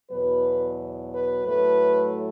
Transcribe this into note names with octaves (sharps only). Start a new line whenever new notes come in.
E2 B2 F#3 B4
B4
A2 F#3 A3 B4